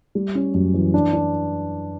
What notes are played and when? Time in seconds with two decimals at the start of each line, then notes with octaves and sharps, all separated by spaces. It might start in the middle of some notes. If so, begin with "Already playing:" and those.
0.15 G3
0.35 C#4
0.54 F#2
0.74 E3
0.94 D4
1.13 D4